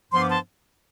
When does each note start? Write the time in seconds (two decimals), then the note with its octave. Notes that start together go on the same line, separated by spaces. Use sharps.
0.12 G2 F3 B3 C6
0.21 D6
0.30 A5 C6